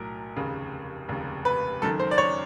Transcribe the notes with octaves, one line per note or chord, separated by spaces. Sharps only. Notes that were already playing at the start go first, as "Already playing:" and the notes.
Already playing: B1 A2 F#3 A#4
F1 D#2 C#3
F1 D#2 C#3
B4
F#1 F#2 D#3 A4
C5
D5
C#5